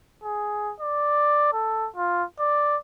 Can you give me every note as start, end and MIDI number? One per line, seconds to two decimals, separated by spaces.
0.23 0.73 68
0.80 1.53 74
1.53 1.88 69
1.96 2.24 65
2.39 2.77 74